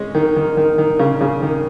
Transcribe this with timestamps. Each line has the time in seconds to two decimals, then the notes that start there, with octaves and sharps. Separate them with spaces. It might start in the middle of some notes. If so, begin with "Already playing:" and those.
Already playing: G#3 C#4
0.15 D#3
0.36 D#3
0.57 D#3
0.78 D#3
0.99 C#3
1.21 C#3
1.42 D#3